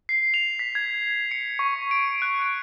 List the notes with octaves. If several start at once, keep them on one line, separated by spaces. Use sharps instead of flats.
C7
F7
B6
G#6
C#7
C#6
D7
F#6
D7